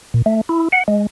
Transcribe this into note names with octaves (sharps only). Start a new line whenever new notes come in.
A#2
A3
E4
F#5
G#3